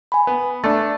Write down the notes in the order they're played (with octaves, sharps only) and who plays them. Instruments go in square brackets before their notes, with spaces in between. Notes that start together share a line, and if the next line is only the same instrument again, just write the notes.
[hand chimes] G#5 B5
[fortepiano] B3
[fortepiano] A3 D4 [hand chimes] A6